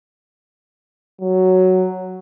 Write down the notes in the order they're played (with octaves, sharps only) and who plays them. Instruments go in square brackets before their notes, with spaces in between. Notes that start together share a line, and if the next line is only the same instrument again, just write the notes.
[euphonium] F#3